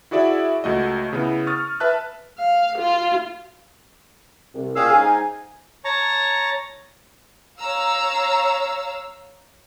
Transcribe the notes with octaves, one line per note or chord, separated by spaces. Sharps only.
E4 F#4 G#4 D5 E5
C#2 A3 F#4 D#5
C#3 B3 E4
C#6 D#6 F6 A6
B4 E5 A5 F#6
F5
F4
C2
A#2 C#4 G#4 F5 G5 E6
G#2 G#5
D#4
C#5 A5 A#5 C#6
C#5 F5 A#5 E6